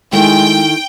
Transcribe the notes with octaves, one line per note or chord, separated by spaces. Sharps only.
D#3 G#3 A3 E4 G5